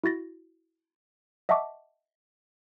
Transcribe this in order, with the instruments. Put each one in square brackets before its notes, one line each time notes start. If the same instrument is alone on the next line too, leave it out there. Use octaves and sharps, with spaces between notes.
[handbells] E4 F#4 A6 A#6
D#5 E5 F#5 A5 C#6 D6